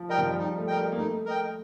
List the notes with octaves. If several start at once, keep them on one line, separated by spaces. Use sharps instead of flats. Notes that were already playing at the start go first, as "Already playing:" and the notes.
Already playing: F3
G3 A#4 D#5 G5
F3
G3
G3 D#4
A3
A#4 D#5 G5
G3
A#3
A3 D#4
A#4 D#5 G5